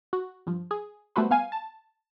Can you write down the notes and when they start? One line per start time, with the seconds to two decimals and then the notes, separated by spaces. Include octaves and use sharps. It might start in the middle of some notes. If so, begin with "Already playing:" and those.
0.13 F#4
0.47 G2 F3
0.71 G#4
1.16 G3 A3 B3 F#4 B4 C5
1.31 B3 F5 G#5
1.52 A5